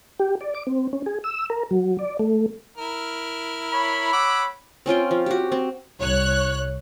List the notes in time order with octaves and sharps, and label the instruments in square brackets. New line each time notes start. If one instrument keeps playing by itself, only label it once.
[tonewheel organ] G4
D5
D6
C4
C#4
G#4
E6
A#4
F#3
D5
A3
[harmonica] E4 A#4
[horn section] C#5 B5
[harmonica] F#5 D6 E6
[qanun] C4 C#4 F4 G5
F3
F#4 G4
C4
[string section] C2 C#5 F#6